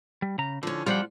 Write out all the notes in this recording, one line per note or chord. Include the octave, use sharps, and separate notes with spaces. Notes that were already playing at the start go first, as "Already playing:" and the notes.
G3
C#3 A#5
D3 F3 C#4
F2 F3 G3 F4 C5 F#5